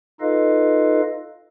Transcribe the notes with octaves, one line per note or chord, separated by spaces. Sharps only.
D#4 F4 A4 B4 D#5 F5